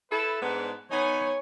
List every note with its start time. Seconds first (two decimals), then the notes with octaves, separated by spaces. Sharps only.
0.11 E4 A4 B4
0.41 G#2 B3 D4
0.91 B3 D#4 C#5 G#5